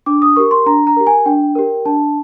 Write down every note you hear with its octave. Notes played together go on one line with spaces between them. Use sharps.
D4 D6
D#6
G4 A#4 C#6
C6
D4 A#5
A#5
G4 A#4
G#5
D4 G5
G4 A#4
D4 A5